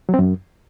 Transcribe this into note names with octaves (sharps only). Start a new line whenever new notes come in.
F#3
C4
F#2